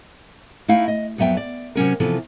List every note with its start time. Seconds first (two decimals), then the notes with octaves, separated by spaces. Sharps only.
0.68 A3 D#4 E4 F5 G5
0.88 D#5
1.18 F2 F#3 B3 E5 G5
1.37 D5
1.75 C3 F#3 C#4 A#4
2.00 C3 E3 F3 B3 A4